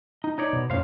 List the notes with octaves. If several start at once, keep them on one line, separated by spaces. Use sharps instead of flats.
D#4
D#4 C#5 D5
B2
F2 A#2 C#4 C5 F5